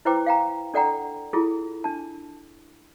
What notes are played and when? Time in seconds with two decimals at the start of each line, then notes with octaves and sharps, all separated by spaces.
0.05 E4 B4 C5 G5 A#5 D6
0.26 F5 G5 A#5
0.74 D4 A4 D5 F#5 G5 A#5
1.33 E4 F4 G#4 A4
1.84 D4 A5